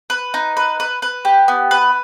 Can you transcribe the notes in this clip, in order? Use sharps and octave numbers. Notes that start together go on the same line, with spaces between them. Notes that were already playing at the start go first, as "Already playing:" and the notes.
B4
D#4
B4
B4
B4
G4
B3
B4